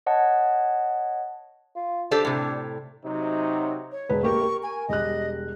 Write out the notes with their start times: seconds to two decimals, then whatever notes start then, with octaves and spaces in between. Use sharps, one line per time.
0.06 C#5 D#5 F#5 A5
1.76 F4
2.11 D4 G4 A4 C5
2.25 A2 C3
3.05 C3 F#3 D#4
3.92 C#5
4.09 E1 B4
4.23 A#3 G4 A#4 C#6
4.42 A#4
4.63 G#5
4.89 E1 G3 D#5 F#6